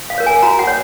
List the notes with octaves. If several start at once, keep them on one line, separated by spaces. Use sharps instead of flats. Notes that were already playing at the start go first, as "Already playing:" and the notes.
F5
A#4 C#5
G#5
F#4 A#5
F#5
C#5